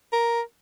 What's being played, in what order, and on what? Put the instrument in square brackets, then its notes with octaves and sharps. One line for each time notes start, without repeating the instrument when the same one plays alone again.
[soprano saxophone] A#4